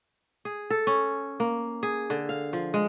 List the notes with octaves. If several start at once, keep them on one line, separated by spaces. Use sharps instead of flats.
G#4
A4
C#4
A#3
G#4
D3
F5
F3
G#3